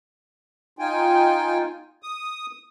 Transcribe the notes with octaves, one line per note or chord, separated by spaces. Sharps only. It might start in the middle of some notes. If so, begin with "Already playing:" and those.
D#4 F4 G5 G#5
D#6